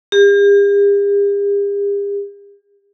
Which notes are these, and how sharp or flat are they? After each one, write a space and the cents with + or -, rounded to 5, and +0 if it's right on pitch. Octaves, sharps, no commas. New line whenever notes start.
G4 +45